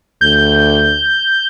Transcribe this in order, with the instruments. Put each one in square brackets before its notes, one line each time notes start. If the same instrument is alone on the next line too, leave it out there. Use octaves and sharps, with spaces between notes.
[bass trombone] D2 [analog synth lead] G6